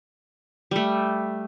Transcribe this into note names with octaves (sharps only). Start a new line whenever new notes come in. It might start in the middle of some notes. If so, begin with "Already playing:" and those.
G3 A3